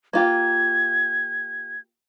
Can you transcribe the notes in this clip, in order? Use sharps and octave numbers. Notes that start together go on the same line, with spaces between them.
A#3 F4 G4 G#6